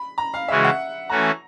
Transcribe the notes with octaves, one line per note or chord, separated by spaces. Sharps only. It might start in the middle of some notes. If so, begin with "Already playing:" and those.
Already playing: B5
A#5
F5
C#3 E3 G#3 C#4 F#4 E5
F#5
E3 A3 C#4 F#4 A#5